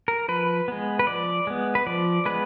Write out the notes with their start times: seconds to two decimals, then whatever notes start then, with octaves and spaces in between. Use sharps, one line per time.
0.08 A#4
0.28 F3 B4
0.68 G#3 B3
0.99 B4
1.07 F3 D5
1.47 G#3 B3
1.75 B4
1.86 F3 D5
2.25 G#3 B3 B4